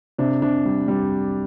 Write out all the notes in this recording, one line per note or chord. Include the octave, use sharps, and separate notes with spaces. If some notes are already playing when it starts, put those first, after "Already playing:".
C3 D4
C3 D4
G3
G3